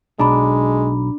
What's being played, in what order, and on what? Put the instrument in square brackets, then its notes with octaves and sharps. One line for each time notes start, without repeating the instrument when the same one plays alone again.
[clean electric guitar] B1 [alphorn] G#3 [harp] D4 [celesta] A#5 B5